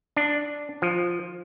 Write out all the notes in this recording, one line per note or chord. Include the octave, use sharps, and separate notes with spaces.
D4
F3